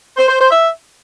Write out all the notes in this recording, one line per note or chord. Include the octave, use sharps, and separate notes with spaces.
C5
C5
C5
E5